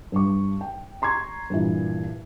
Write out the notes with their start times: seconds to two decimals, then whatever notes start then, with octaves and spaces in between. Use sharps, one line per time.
0.12 G2 G3 C#6
0.61 G5
1.02 A#5 C6 C#6 G#6
1.50 G2 A#2 E3